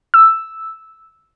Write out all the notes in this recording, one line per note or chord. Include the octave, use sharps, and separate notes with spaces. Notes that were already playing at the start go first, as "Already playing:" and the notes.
E6